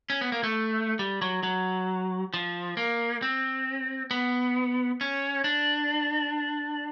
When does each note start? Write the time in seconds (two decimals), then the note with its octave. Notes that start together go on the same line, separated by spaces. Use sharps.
0.10 C#4
0.21 B3
0.32 A#3
0.43 A3
0.99 G3
1.22 F#3
1.43 F#3
2.34 F3
2.77 A#3
3.22 C4
4.11 B3
5.01 C#4
5.44 D4